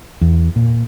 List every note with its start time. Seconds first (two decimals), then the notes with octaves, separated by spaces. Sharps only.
0.21 E2
0.56 A#2